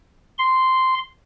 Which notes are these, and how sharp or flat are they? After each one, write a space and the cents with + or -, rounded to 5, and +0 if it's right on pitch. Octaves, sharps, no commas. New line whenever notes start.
C6 -10